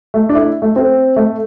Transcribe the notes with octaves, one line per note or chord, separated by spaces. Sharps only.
A3
D4
E4
A3
C4
A3